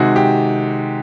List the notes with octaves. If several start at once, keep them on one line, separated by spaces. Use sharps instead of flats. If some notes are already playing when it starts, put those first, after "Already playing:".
Already playing: C3 D#3 G#3 F#4
G4